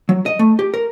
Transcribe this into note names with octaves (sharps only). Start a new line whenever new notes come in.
F#3
D#5
A3
G4
A#4